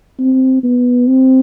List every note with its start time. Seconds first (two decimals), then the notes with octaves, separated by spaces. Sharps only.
0.19 C4
0.63 B3
1.08 C4